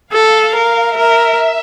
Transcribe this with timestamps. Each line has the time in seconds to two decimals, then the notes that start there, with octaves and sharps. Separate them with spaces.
0.13 A4 F5
0.55 A#4
0.98 A#4 E5